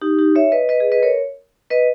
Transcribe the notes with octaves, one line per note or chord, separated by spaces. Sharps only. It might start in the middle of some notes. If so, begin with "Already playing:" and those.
D#4 G4
D#4 G4
C#5 E5
B4 D#5
B4 D#5
G#4 B4
B4 D#5
A#4 C#5
B4 D#5